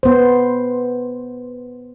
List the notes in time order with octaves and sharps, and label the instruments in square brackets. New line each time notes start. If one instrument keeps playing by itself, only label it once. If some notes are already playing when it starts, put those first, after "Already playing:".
[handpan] B3 C5